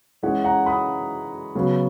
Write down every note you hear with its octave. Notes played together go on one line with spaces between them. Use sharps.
E3 G#3 C#4 F#5
F#5 A#5
B5 D#6
C#3 F#3 B3